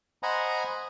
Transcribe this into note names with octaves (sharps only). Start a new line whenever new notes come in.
C5 D#5 F#5 G#5 A#5 B5